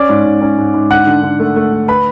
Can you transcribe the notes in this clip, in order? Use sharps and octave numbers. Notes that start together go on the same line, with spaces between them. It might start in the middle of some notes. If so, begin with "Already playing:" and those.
Already playing: C#4 D5 D6
G#2
G#2
C#4
G#2
G#2
D3 F#5 F#6
D3
D3
A3
A3
D3
B4 B5